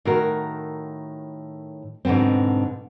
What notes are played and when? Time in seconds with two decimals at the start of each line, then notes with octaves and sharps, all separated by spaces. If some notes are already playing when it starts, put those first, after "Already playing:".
0.05 A2 D#3 F#4 A#4
2.05 G#2 B2 D3 B3 C4